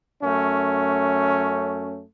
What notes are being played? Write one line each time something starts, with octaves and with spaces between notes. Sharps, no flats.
F#2 A3 C#4